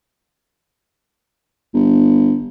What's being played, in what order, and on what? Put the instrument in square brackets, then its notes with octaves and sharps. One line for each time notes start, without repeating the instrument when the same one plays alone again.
[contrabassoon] G1